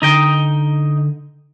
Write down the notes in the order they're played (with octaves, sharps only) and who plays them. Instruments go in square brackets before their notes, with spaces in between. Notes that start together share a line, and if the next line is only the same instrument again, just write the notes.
[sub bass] D3 [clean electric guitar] D#4 D#5 G5